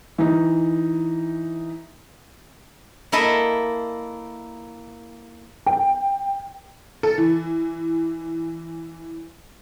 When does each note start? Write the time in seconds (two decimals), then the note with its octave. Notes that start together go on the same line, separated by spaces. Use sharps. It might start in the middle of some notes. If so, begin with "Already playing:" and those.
0.18 E3 D#4
3.12 A#3 E4 A4 D#5 E5
5.66 G5
7.03 A4
7.18 E3